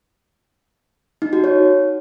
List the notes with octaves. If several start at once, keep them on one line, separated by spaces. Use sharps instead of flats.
D#4
F#4
C#5